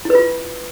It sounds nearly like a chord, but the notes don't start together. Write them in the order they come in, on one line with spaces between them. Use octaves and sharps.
E4 B4 F4